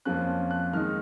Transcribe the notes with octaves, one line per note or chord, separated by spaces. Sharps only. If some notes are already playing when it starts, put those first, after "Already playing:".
F2 F3 A#3 C#4 F#6
F#6
D#3 G#3 D#4 F6